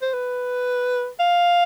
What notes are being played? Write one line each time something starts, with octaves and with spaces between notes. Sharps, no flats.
C5
B4
F5